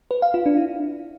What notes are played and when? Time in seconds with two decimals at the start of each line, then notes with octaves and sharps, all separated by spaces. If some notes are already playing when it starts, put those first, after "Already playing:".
0.11 B4
0.22 F5
0.34 F4
0.46 D4
0.57 E4